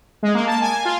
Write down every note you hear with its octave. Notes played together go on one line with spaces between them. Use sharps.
G#3
A#3
A5
G#5
F4